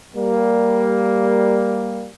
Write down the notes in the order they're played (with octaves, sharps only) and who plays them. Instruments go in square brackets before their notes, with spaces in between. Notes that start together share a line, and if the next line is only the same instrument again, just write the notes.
[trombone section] G3 A#3